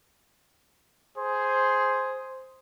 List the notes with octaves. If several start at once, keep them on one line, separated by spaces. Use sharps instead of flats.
G#4 C5